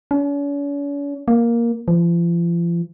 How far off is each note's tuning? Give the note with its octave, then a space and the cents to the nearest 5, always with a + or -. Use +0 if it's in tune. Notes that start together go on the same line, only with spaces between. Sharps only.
C#4 +45
A#3 +5
F3 -40